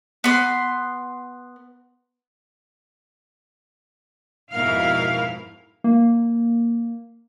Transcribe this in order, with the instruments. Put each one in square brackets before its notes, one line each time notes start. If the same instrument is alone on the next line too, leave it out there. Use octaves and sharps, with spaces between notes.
[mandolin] B3 C6
[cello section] F2 G#2 B2 E4 A#4 F5
[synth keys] A#3